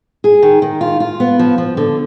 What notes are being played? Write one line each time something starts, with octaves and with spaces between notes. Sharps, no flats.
G#4
D#3
D#3
F4
F4
B3
F3
F3
D3